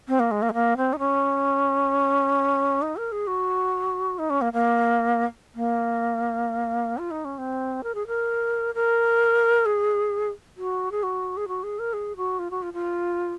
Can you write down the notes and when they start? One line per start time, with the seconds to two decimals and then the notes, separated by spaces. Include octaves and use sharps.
0.08 C4
0.20 A#3
0.31 G#3
0.42 A#3
0.49 G#3
0.53 A#3
0.77 C4
0.93 D#4
0.99 C#4
2.82 D#4
2.97 A#4
3.12 G#4
3.27 F#4
4.19 D#4
4.30 C#4
4.41 A#3
4.53 A#3
5.55 A#3
6.98 F4
7.11 D#4
7.25 C#4
7.38 C4
7.84 A#4
7.95 G#4
8.07 A#4
8.75 A#4
9.66 G#4
10.57 F#4
10.92 G#4
11.03 F#4
11.37 G#4
11.48 F#4
11.63 G#4
11.79 A#4
11.93 G#4
12.17 F#4
12.39 F4
12.51 F#4
12.62 F4
12.73 F4